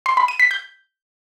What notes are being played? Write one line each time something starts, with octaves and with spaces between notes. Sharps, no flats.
C6
B5
D#7
B6
G6